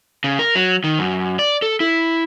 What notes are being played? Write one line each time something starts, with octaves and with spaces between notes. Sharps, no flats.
C#3
A#4
F#3
D#3
F#2
D5
A4
E4